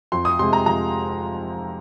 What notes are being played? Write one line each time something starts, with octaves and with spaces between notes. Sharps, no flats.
F2 C6
D#6
C3 G#3 C6
A#5
F2 A#5